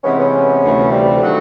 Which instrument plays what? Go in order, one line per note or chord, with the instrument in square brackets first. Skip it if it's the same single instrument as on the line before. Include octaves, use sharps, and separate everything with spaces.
[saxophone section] C3 E3 G#3 [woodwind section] B3 C#4
[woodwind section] B3 C#4
[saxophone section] D2 C3 E3 A3
[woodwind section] F3 G3
[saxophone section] D#3 F#3 A3 D4 F#4